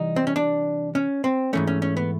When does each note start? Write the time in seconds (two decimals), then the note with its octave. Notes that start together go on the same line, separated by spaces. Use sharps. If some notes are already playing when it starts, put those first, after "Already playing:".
Already playing: C3 E3 G3 D#4
0.16 C4
0.27 C#4
0.36 D4
0.95 C#4
1.24 C4
1.53 G#2 E3 A3 C#4
1.67 C#4
1.82 C#4
1.97 B3